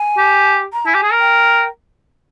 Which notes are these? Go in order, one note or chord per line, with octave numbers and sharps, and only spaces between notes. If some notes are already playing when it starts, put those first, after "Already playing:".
Already playing: G#5
G4
A#5
E4 G#5
G4
G#4
A#4
G5